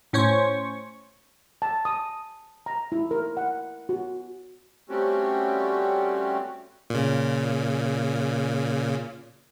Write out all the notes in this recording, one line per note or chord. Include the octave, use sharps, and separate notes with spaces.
A2 C#4 C5 C#5 C#6
A5
D#6
A#5
E4
A#4
F#5
F#4
G3 A3 C4 C#4 F#4 G4
A#2 C#3